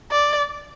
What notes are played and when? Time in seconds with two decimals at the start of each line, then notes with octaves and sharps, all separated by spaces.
0.11 D5